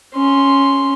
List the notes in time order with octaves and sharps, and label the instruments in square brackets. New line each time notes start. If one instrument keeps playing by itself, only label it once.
[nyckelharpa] C#4 C6